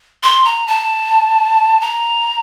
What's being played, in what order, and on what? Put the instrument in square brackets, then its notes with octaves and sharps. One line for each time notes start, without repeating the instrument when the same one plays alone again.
[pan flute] C6
A#5
A5
A#5